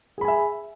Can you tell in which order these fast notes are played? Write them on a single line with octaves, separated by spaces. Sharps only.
G#4 B5 G#5 E5